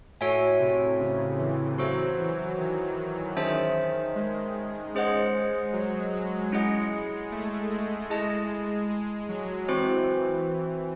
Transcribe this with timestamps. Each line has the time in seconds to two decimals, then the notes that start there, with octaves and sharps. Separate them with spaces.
0.20 A2 F#4 A4 C#5 E5 G#5
0.60 C3
1.00 C#3
1.38 E3
1.79 F#3 F#4 A4 C5
2.18 E3
2.57 D#3
3.36 D#3 C#4 G#4 C5 E5 A5
4.15 G#3
4.94 G#3 C#4 G#4 C5 D#5 F#5
5.73 F#3
6.13 F#3
6.52 G#3 C#4 E4 G#4 D#5 F#5
7.32 A3
7.71 G#3
8.10 G#3 E4 G#4 D#5 A5
8.89 G#3
9.29 F#3
9.68 E3 C4 F#4 C5